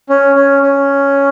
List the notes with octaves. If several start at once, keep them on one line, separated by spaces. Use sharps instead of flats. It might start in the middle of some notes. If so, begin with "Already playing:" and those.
C#4
C#4
C#4